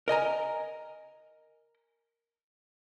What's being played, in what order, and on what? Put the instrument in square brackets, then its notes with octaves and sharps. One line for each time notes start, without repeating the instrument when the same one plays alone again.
[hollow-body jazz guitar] A#4 D#5 G#5 A#5